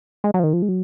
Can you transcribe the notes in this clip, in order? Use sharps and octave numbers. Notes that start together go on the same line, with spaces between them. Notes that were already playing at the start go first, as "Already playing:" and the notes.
G#3
F#3
F3
D#3
F3
G#3
F#3